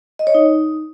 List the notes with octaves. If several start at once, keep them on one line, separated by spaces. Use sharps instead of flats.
D#5
C#5
D#4